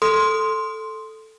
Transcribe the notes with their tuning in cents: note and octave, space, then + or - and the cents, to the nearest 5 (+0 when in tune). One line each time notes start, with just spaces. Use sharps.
A4 +0 C6 +0 D#6 +0